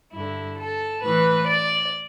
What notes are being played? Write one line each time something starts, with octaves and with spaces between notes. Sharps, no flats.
G2 D3 E4
A4
A2 E3 B4
D5